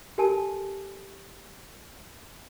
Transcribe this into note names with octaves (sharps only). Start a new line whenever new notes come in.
G4 A4 A#4 G#5 A5